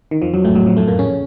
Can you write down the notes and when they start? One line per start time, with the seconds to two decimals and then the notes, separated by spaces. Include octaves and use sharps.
0.11 D#3
0.22 F2 F3
0.33 F#2 F#3
0.44 A2 A3
0.55 F#2 F#3
0.66 F2 F3
0.77 A2 A3
0.88 A#2 A#3
0.99 C#3 C#4